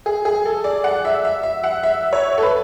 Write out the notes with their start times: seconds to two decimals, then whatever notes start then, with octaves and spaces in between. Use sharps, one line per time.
0.06 G#4
0.25 G#4
0.45 A4
0.64 D5
0.84 F#5
1.05 E5
1.25 E5
1.43 E5
1.64 F#5
1.83 E5
2.13 C#5
2.38 A4
2.43 B4